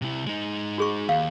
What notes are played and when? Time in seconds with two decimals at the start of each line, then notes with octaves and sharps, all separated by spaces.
0.02 C3 E4
0.27 G#3 D#4
0.78 F#4 G#4 C#6
1.09 D#2 F5